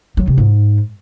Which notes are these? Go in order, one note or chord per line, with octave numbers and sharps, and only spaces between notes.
F#3
C3
G#2